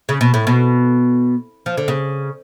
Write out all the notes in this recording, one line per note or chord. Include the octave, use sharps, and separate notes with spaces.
C#3
B2
A2
B2
F3
D3
C#3